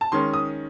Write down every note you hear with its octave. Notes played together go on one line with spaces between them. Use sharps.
A5
D#3 G#3 C#4 C6
D#6